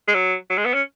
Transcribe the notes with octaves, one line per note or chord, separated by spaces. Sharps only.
G#3
F#3
F#3
G#3
B3
C#4